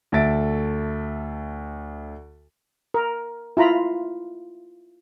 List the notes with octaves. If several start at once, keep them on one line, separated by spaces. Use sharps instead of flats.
D2 A4 E5 A6 D7
A#4
E4 F4 A#5 B5